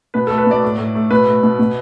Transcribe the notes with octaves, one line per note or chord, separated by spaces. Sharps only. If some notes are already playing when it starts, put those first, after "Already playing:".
B2 B4
A4
A3
B4
B2 D5
A2
A2
A3
B2 B4
A3
B2
B2